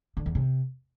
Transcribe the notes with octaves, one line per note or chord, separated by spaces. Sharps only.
D3
E2
C3